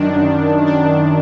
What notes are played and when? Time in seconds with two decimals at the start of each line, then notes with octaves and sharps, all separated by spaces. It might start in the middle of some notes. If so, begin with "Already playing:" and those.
Already playing: F#2 D#3 D4
0.67 D4